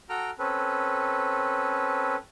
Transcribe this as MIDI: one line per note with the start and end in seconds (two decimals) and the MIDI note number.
0.09 0.31 66
0.09 0.31 69
0.09 0.31 79
0.09 0.31 82
0.09 0.31 89
0.39 2.16 60
0.39 2.16 61
0.39 2.16 69
0.39 2.16 71